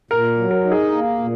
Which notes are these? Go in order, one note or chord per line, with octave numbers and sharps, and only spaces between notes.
A#2 A#4
F#3
A#4
D#4
G#4
A#3
A#2